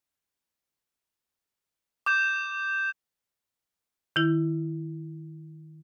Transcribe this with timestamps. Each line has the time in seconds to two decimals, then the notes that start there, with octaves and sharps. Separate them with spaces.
2.06 D6 G6 E7
4.16 D#3 E4